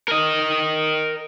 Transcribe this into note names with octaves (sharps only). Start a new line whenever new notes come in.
A#4 D#5